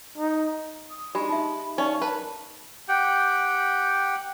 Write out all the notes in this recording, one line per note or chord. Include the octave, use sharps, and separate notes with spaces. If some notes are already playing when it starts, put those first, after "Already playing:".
D#4
D#6
G#3 D4 D#4 F4 G4 B5
D#4 E5 B5
C#4 D#4 D5 F5 C#6
A#4 B4 A5
G4 F#5 G5